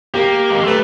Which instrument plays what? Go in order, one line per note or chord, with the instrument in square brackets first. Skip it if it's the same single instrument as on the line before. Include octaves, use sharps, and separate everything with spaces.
[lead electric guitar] A#3 [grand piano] G4
[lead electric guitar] G#3
[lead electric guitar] A3 [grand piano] B4